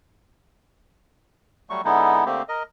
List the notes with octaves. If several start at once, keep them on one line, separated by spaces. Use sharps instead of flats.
F#3 G3 A3 C#6
D3 G#3 B3 D#4 E4
D3 A3 A#3 C4 G4
A#4 D#5